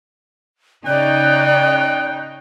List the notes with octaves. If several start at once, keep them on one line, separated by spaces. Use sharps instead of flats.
C#3 D#4 D5 G5 F#6